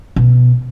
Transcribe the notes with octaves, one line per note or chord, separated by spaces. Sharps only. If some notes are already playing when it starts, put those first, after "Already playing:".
B2